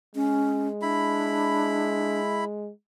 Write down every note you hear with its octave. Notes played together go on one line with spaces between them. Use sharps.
G#3 C#4
D4 E4 B5